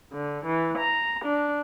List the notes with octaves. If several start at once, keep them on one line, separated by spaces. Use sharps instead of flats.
D3
E3
A#5
D4